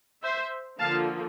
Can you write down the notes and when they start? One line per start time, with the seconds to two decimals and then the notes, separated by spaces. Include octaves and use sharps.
0.23 C5 E5
0.79 D3 F3 A#3 F4 F5 A5